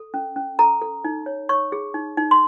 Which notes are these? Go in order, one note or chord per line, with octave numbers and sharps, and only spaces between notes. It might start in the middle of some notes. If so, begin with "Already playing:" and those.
Already playing: A4
C#4
C#4
A4 A#5
A4
D#4
C#5
C#5 C#6
G#4
D#4
D#4
C6